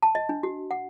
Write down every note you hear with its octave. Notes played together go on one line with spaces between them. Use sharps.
A5
D#5
D4
F#4
F#5